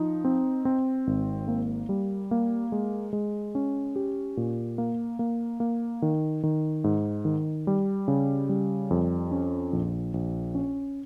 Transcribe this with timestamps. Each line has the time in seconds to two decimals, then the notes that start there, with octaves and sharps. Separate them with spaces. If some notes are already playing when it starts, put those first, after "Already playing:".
Already playing: F3 D#4
0.25 C4
0.65 C4
1.07 G#1
1.48 A#3
1.89 G3
2.31 A#3
2.72 G#3
3.13 G#3
3.55 C#4
3.96 G4
4.37 A#2
4.78 A#3
5.19 A#3
5.60 A#3
6.02 D#3
6.43 D#3
6.84 G#2
7.25 D#3
7.67 G3
8.08 C#3
8.49 G3
8.91 F2
9.31 C#4
9.73 A#1
10.14 A#1
10.55 C#4